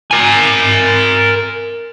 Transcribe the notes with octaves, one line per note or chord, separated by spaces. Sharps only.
A#4 G#5